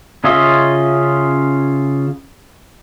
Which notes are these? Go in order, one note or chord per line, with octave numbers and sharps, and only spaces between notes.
C#3 C#4 F4 D#5 E5